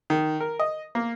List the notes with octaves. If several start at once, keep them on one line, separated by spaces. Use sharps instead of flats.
D#3
A#4
D#5
A#3